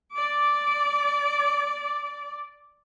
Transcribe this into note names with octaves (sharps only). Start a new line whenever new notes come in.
D5 D6